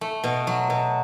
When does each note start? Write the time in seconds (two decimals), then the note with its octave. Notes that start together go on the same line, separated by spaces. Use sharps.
0.01 A3
0.24 B2
0.47 F#3
0.70 B2